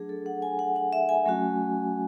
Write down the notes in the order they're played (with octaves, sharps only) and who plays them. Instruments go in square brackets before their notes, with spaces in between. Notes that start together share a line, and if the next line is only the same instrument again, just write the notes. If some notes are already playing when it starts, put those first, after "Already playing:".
Already playing: [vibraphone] F#3 A3 D4 G#4
A4
F#5
G#5
F#5
F#5
E5
G#5
F#3 A3 C#4 F#4